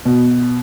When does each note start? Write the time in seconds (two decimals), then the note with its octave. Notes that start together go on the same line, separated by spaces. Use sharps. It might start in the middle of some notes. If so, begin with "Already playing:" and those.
0.05 B2